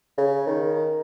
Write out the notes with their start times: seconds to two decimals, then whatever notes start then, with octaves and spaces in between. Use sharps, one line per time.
0.18 C#3
0.47 D#3